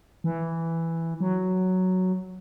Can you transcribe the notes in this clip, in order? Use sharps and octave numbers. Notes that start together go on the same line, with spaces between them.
E3
F#3